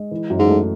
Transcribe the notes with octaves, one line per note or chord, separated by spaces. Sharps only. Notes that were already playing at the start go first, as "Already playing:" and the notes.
Already playing: G#3
E3
F#2
G#2
A3